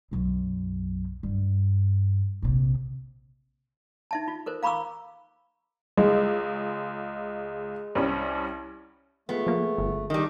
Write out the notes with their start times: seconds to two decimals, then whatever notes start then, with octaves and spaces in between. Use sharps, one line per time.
0.11 B1 F#2
1.23 G2
2.42 A#1 C3
4.11 D#4 E5 A5
4.28 F4
4.46 A4 A#4 C5
4.63 F5 A#5 B5 C#6 D6 E6
5.97 C#2 G#3
7.95 C2 G3 C#4
9.29 G#3 A3 B3 F4
9.47 F3 A#3
9.78 G1
10.10 D#3 G3 D4